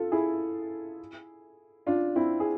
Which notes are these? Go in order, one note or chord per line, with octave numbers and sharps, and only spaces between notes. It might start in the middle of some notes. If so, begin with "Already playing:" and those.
Already playing: F4 A4
E4 G#4
D4 F4
C4 E4
G#4